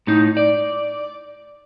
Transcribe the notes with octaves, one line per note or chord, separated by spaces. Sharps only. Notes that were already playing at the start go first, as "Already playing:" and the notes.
A2 D#4
D5